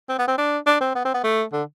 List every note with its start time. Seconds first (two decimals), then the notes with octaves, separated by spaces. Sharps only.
0.09 C4
0.19 B3
0.28 C4
0.38 D4
0.66 D4
0.81 C4
0.95 B3
1.05 C4
1.14 B3
1.24 A3
1.53 D3